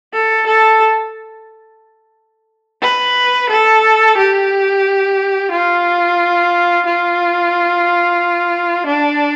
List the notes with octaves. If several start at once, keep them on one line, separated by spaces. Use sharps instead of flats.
A4
A4
B4
A4
G4
F4
F4
D4